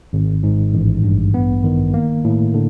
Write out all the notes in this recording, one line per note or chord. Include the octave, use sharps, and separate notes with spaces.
G#1
G#2
A1
G2
B3
D#3
A#3
A2
D3